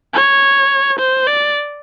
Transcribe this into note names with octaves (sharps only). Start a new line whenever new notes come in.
C#5
C5
D5